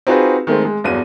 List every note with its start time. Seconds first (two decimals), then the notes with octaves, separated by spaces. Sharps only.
0.07 C4 D#4 F4 F#4 G#4 B4
0.47 D#3 G#3 A3 C4
0.65 G#3
0.84 G1 E2 F#3 G#4 D#7